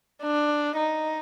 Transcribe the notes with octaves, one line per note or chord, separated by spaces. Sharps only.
D4
D#4